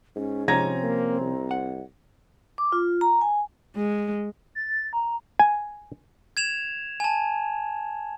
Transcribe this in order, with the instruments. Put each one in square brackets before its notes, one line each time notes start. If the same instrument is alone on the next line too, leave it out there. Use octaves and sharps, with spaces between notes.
[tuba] G#2 [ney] C#4
[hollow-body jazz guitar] C3 F3 C#4 [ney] C4 [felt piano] A#5 G#6 A#6
[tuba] A#3
C2
[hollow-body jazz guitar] F#5
[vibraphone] D6
F4
A#5
G#5
[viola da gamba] G#3
[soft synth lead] A6
A#5
[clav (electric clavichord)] G#5
[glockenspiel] G#6 E7 F7
G#5 A5